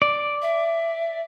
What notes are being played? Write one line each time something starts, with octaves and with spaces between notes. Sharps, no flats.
D5
E5